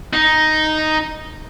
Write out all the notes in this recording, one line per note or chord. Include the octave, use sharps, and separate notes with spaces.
D#4